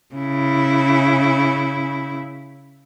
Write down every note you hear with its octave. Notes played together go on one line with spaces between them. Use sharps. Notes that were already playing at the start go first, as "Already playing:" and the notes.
C#3 E4